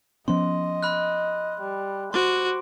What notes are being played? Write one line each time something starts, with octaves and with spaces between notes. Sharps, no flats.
F3 B3 C#4 D#5 C6
B5 F6 F#6
G3
F#4 C5 C6 D6 D7